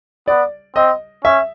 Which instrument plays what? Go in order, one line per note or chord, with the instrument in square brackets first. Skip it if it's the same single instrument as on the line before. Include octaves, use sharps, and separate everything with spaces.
[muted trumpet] B3 [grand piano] D5
[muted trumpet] C4 [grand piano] D#5
[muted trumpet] C#4 [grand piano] E5